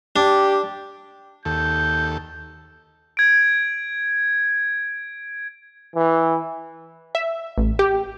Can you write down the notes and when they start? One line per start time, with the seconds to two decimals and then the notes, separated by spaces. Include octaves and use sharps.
0.16 D4 G4
1.45 D#2 A4 G6
3.17 G#6 D7
5.95 E3
7.15 E5
7.58 A1
7.79 G4